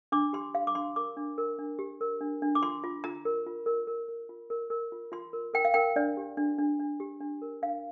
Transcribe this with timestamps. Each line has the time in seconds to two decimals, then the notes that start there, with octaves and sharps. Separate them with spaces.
0.12 D4 D6
0.33 G4 C6
0.55 G4 F5
0.67 D6
0.75 D4 C6
0.96 A#4 D6
1.17 D4
1.38 A#4
1.58 D4
1.79 G4
2.01 A#4
2.21 D4
2.42 D4
2.55 D6
2.62 F4 C6
2.84 F4
3.04 F4 A#5
3.25 A#4
3.46 F4
3.66 A#4
3.87 A#4
4.08 A#4
4.29 F4
4.50 A#4
4.70 A#4
4.92 F4
5.12 F4 C6
5.33 A#4
5.54 A#4 G5
5.65 F5
5.74 A#4 G5
5.96 D4 D5
6.17 G4
6.37 D4
6.58 D4
6.79 D4
7.00 G4
7.20 D4
7.42 A#4
7.62 D4 F5